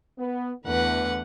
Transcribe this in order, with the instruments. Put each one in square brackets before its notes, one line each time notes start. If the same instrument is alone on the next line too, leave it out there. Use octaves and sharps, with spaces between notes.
[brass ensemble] B3
[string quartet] E2 B4 F#5 [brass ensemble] D3 E3 A3